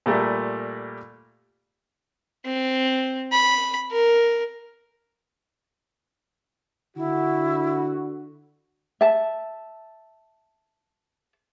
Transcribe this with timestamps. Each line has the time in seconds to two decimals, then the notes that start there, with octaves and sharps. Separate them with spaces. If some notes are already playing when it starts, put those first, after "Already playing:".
0.06 A#2 G3 A3 A#3
2.45 C4
3.32 B5
3.91 A#4
6.97 D3 E4 F#4
9.01 E5 A5